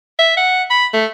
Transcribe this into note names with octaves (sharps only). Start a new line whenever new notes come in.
E5
F#5
B5
A3